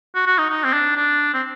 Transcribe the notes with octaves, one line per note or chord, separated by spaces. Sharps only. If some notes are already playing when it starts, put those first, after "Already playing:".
F#4
F#4
D#4
D#4
C4
D4
D4
C4